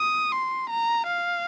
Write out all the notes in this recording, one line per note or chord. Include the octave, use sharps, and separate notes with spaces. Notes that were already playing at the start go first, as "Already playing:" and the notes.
Already playing: D#6
C6
A#5
F5